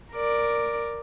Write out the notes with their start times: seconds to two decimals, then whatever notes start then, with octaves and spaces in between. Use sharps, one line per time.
0.12 A#4 D5